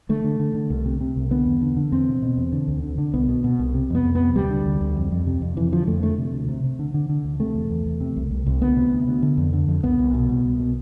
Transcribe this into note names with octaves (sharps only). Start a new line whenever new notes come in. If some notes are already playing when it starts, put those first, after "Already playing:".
D3 A3
D3
D3
D3
C2
C3
C3
C2
D3 B3
E2
D3
D3
E2 C4
B2
B2
E2
D3
D2
D3
D3
C2 B3
B2
B2
C2
C3
F2 B3
F2
C3 B3
D2 G3
D3
D2
D2
F2
F2
C3
F2
F2 E3
D3 F3
F2 A3
D3 A3
C3
D2
C3
C3
D3
D3
D3
D2
C3 A3
E2
E2
E2
C3
C2
C2
C2
D2 B3
C3
D2
D2
D3
F2
D3
F2
C2 B3
C2
B2
C2
C2
B2